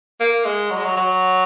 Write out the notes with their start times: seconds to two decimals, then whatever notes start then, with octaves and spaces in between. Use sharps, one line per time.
0.20 A#3
0.45 G#3
0.70 F#3
0.78 G#3
0.85 F#3
0.97 F#3